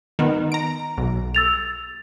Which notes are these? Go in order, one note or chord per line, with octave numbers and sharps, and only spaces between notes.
D#3 B3
A#5 D7
B1
E6 A6 F7